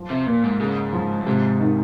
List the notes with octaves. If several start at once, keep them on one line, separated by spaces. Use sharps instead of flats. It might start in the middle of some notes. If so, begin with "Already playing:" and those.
Already playing: F3
C3
A#2 A#3
G#2
G#2 C#3
F3
F#2
G#2 C3
D#3